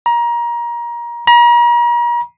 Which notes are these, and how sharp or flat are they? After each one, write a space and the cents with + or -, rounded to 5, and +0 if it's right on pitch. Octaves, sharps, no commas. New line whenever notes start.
A#5 +25
A#5 +40